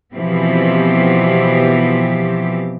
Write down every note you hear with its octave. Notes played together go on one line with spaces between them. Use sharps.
B2 E3 F3 B3 C4 G4